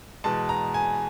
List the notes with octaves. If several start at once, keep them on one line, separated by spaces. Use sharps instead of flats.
E2 B2 G#3 A5
A#5
G#5